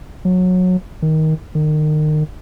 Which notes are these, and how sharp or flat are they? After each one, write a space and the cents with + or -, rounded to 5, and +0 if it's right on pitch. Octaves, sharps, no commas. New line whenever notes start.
F#3 -20
D#3 +15
D#3 -30